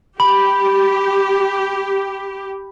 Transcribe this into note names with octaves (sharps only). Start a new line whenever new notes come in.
G4 B5